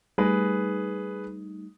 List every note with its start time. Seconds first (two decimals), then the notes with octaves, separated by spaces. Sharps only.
0.18 G3 A3 D#4 G#4 B4